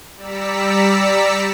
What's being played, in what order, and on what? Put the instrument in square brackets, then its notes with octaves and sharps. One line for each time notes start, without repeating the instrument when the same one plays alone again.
[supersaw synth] G3 D5 A#5 E6 B6 C#7